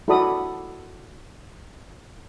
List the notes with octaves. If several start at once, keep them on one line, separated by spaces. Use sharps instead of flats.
E4 F#4 A4 D5 B5 D#6